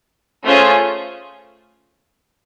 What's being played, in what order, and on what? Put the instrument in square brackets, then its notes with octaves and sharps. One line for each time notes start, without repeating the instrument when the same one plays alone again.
[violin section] A3 C#4 F4 G#4 C5